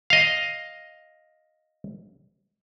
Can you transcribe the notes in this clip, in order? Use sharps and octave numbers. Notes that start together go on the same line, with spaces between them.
D#5 F5